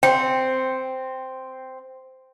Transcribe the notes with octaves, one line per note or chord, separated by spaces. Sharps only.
C4 G5